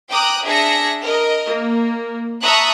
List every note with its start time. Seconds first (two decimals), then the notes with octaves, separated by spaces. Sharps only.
0.10 G5 A#5 D6 D#6 F#6
0.44 D4 G#4 E5 A#6 C#7
1.02 A#4 D#5
1.49 A#3
2.41 E5 A5 A#5 C#6 D#6 F#6